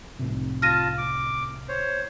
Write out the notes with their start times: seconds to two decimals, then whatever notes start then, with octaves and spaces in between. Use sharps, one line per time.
0.19 C2 A2 C3
0.62 F4 A5 F6 A#6 D#7
0.98 D6
1.69 C5 C#5